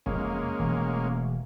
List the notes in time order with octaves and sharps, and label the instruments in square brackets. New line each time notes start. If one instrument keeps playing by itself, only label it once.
[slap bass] F1 E2 [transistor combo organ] G#3 A#3 C#4
[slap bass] E1 E3 A3